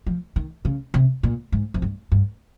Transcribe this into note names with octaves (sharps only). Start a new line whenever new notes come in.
F3
D#3
C#3
C3
A#2
G#2
F2
G2
G2